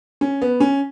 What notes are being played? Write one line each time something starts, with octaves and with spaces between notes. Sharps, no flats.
C#4
B3
C#4